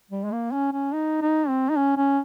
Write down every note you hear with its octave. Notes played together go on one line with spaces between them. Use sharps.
G3
G#3
A#3
C#4
C#4
D#4
D#4
C4
D#4
C#4
C#4